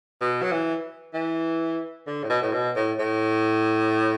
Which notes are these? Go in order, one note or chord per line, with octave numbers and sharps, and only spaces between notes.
B2
F#3
E3
E3
D3
A2
B2
A2
B2
A2
A2